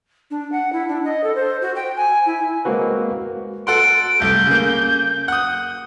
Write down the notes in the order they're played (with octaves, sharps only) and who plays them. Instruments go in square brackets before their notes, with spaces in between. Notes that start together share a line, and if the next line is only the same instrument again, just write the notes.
[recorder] D4
F#5
E4
D4
D#5
A4
C5
F#4
G5
G#5
E4
[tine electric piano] G#3 A#3 C4 F#4 B4
[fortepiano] A4 F#5 C6 [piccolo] D7
[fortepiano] C2 A3 [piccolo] G6
[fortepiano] C#3 A#3
F#5 D#6